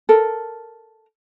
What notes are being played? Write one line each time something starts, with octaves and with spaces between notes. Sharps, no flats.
A4 A#4